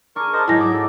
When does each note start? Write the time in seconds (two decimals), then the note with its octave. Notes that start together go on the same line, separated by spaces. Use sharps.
0.16 D4 G#4 A#4 C#6
0.33 A#4 C5 D#5 A5 A#5
0.48 G#2 F#3 D#4 E4 G#4 A#6
0.60 D#5 D6
0.73 A4